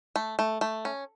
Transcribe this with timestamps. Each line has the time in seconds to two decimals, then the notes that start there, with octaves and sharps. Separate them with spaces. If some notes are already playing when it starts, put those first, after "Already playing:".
0.16 A3
0.39 A3
0.61 A3
0.85 C#4